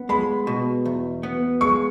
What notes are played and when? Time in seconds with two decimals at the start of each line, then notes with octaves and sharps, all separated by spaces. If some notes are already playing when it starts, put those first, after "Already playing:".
Already playing: B3
0.09 G#3 B5
0.47 B2
0.85 E2
1.23 B3
1.61 G#3 C#6